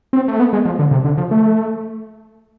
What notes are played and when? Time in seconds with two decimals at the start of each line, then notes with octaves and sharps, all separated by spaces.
0.13 C4
0.28 A3
0.40 B3
0.53 G#3
0.65 F3
0.79 D3
0.91 C3
1.05 D3
1.18 F3
1.31 A3